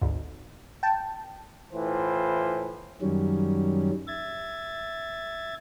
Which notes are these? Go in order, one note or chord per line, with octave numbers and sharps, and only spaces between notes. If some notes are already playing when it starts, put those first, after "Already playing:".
G#1 D2
G5 A5
A2 E3 F4 C5
F#2 D#3 F#3 G3 C#4
E5 G#6 A6